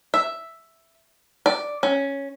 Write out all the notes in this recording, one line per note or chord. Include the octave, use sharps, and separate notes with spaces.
E5
D5
C#4